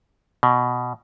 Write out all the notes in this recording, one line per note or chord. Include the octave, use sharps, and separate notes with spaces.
B2